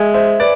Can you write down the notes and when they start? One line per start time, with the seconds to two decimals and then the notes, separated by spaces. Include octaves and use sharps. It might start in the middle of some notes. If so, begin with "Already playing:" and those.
Already playing: G#3 E5 G#5
0.14 C5 E5
0.40 B4 D5